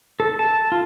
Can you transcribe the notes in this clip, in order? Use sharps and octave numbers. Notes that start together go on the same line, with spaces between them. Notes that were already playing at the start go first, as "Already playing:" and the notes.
A4
A5
F4